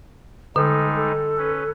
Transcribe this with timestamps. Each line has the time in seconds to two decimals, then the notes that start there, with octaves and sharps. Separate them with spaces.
0.56 D3 G3 G#3 D#4 A4
0.96 A4
1.38 C#4 B4